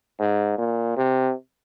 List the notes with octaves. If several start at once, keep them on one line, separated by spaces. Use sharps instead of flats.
G#2
A#2
C3